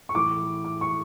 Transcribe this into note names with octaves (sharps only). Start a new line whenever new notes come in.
C#6
A2 E3 D6
D6
C#6